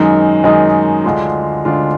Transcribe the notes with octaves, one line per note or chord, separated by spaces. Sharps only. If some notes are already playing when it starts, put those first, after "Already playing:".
Already playing: F#2 D#3 G#3 D#4
F#2 D#3 G#3 D#4
D2 D3 G#3 D4 F4
D2 D3 G#3 D4 F4